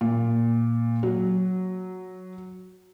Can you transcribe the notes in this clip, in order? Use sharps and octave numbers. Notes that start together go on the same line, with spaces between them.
A#2
F#3